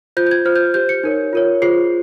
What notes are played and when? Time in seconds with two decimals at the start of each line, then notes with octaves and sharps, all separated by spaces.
0.17 F4 C5 G6
0.27 G6
0.31 G#6
0.45 F4 C5 F6
0.56 G6
0.74 G4 C5 G6
0.89 C#7
1.03 D#4 A#4 C#5
1.33 F4 A#4 C#5
1.62 F4 G#4 C5 C7